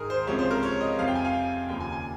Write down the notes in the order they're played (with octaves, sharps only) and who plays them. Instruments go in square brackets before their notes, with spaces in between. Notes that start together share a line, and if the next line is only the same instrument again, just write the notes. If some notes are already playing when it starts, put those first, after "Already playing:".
Already playing: [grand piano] G#2 D#3 G#3 G#4 A#4
C5
C#2 C3 F3 G#3 C#5
C5
A#4
C#5
D#5
F2 C3 F3 F5
G5
G#5
F5
G5
D#2 C#3 F3 A#3 G5
G#5
G#5